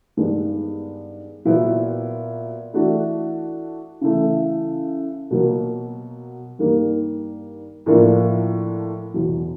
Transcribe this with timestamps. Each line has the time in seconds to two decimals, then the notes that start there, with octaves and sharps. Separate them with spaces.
0.17 G2 D#3 G#3 B3
1.45 A#2 F#3 B3 E4
2.74 E3 A3 D4 F#4
4.01 C#3 E3 A3
5.31 B2 F#3 A#3
6.59 G2 D#3 G3 A#3
7.86 A2 F3 A#3 D4 F4
9.14 E2 B2 F#3